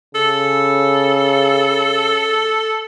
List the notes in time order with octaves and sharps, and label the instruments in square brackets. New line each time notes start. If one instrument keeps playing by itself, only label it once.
[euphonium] C#3 [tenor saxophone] A4